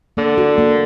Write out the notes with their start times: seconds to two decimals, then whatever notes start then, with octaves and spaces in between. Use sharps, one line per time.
0.17 D3 A#3
0.38 F#4
0.58 A#3